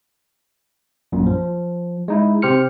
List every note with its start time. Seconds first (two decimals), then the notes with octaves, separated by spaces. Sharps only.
1.12 A#1 F#2 A#2
1.26 F3
2.08 G#3 D#4 E4
2.42 C3 G4 C5 F6 C#7